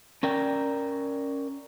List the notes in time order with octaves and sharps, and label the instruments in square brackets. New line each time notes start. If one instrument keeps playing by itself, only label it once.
[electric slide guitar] C#4 A#4 D5 G5